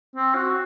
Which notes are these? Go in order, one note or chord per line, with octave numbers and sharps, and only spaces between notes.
C4
F#4